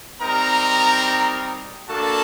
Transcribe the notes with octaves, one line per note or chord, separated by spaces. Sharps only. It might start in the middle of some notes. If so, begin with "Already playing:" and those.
G3 C4 D#4 A#4 A#5
A#3 D4 F#4 A4 A5